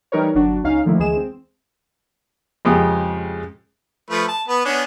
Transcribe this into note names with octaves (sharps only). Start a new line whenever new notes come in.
E3 G3 D#4 A#4 B4 C#5
G1 F#3 D4 F#4
C#2 C#4 D#4 F5
D3 D#3 F3 A3 A#3 E4
D2 E3 G#3 G#4 E7
C4
F2 C#3 G#3 G4 D#6
F3 A3 B4
A5
B3 B4
B3 C#4 D4